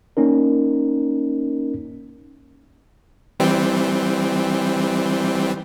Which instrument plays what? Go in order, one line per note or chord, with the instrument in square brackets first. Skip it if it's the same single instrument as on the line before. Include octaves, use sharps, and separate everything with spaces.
[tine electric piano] A#3 C#4 D#4 A#4
[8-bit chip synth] E3 G3 C4